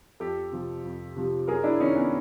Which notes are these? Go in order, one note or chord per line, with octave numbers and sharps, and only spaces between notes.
F2 G4 A4
C3 F3
F2
C3 F3
F#2 G#4 A#4
D4 E4
D#3 C#4 D#4
B3 C#4